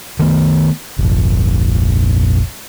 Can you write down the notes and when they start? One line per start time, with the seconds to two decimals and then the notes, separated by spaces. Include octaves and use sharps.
0.19 D#3 A3 B3
0.99 F1 A#1